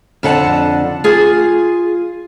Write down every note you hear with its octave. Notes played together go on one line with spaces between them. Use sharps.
F2 D3 F#5 A5
F4 G#4